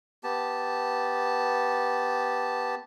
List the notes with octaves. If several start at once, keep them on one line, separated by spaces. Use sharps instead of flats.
B3 G4 A5